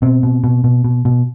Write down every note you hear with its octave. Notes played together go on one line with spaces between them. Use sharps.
B2 C4
B2
B2
B2
B2
B2